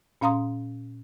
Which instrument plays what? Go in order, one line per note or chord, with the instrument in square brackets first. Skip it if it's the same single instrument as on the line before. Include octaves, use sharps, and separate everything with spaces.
[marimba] A#2 C#4 F5 A#5 C6 D#6